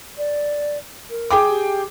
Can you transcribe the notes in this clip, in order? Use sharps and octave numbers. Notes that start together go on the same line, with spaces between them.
D5
A#4
G#4 G5 D6
G4